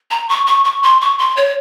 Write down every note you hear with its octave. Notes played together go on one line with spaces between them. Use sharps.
A#5
C#6
C#6
C#6
C6
C#6
C6
C#5